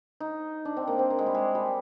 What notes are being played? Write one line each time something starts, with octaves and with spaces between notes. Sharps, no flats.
D#4
D4
C4
A#3
C4
A#3
G#3
G3
G#3
G3